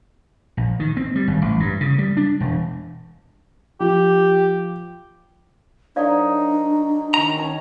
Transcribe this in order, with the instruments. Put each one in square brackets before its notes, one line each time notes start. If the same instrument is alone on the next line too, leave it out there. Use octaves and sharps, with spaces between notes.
[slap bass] A#1
D#3
C4
G3
G#1
A1
G2
C#3
G3
D4
E1
[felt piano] F3 [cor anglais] G4
[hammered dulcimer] F#3 D#4 A#4 [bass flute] D4 [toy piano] C5 D5 F5
[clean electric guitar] D#3 A#5
[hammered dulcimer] C#4 A5 C#6